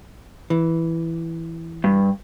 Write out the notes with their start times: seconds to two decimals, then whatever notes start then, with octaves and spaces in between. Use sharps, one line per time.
0.50 E3
1.84 G2